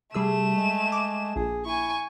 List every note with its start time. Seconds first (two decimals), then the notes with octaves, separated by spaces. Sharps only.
0.14 C3 G3 A3 G#4 E6 E7
0.56 G#3
0.92 D6
1.36 A#1 G#4
1.66 E4 G#5 C#6